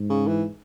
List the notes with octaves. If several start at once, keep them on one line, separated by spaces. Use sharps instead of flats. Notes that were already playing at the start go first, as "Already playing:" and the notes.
Already playing: G#2
C#3
E3